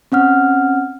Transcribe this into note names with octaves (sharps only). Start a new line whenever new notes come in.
C4 C#4 F#5 F6